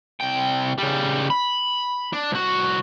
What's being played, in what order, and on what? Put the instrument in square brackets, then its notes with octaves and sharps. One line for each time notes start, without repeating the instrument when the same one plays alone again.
[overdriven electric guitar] C2 G5
C#3 G3
B5
D4
C2 F#4